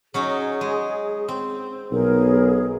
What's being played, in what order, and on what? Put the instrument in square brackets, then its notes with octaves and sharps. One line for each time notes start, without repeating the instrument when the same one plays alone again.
[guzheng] F#3 C#4 D#4 [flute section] G#4
[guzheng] G#3
C4
[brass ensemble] B1 [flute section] G#4 A#4